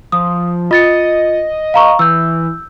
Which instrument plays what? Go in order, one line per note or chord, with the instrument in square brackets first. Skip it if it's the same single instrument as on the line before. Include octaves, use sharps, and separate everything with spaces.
[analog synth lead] F3 [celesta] D#6
[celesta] F4 A6 C#7 [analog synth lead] D#5
[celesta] F5 A#5 C#6
[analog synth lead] E3 [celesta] E6 G6